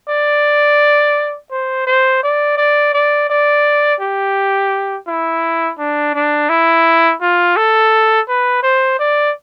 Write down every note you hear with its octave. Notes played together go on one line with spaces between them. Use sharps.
D5
C5
C5
D5
D5
D5
D5
G4
E4
D4
D4
E4
F4
A4
B4
C5
D5